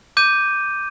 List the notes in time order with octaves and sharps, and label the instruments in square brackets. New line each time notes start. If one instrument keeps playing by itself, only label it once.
[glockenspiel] D6 G6 D#7